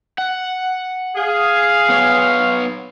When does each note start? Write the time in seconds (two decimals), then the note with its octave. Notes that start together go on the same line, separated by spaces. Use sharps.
0.18 F#5
1.17 G#4 F5
1.90 B3 C#5